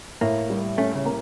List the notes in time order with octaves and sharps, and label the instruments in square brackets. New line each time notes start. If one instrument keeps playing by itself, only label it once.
[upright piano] A2 [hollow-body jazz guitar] A#3
[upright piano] G3
[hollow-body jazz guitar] A3 [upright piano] C#4
[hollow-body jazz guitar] C#3
[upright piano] A#3